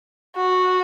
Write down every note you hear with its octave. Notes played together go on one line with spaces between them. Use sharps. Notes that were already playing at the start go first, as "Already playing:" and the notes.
F#4